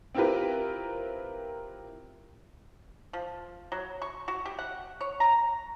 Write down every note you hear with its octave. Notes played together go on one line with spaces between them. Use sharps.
C4 E4 F4 G4 A#4 B4
F3
F#3
C#6
F#4
G4
F#5
C#5
A#5